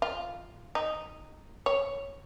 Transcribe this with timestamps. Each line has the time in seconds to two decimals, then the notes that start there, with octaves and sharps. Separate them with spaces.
0.02 F4
0.75 D#4
1.66 C#5